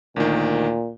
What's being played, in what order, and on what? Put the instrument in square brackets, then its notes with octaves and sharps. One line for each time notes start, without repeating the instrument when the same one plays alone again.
[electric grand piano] D2 D#3 [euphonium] A#2